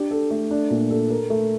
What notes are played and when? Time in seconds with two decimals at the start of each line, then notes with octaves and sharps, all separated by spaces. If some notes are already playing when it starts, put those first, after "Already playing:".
Already playing: D4 G4
0.11 A4
0.31 A3
0.51 D4
0.71 A#2
0.90 A4
1.10 A#4
1.30 A3